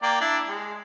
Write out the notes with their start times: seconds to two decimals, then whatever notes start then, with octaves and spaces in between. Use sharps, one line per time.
0.03 A#3 D5 G5
0.21 D4 E4 D5
0.48 G#3